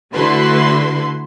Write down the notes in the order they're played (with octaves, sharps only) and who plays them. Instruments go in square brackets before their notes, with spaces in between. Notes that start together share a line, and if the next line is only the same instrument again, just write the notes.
[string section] D3 A3 E4 F#4 B4 C6